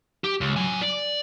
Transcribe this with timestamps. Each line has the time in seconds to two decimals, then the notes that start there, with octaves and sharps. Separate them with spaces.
0.24 G4
0.41 C#2
0.56 F#3 G#5
0.82 D5